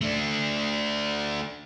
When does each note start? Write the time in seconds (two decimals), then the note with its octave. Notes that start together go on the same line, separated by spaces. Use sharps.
0.01 A3 D4